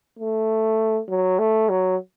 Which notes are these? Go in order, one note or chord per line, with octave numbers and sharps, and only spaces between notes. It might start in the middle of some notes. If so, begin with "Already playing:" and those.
A3
F#3
A3
F#3